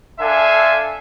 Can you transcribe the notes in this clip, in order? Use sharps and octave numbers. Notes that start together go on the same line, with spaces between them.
D4 A4 E5 F5 G#5 C6